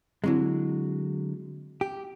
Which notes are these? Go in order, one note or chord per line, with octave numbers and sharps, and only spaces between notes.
D3 F#3 G#3 C4 E4
G4